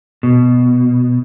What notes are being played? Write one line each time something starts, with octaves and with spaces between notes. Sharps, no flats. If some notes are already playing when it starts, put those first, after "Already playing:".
B2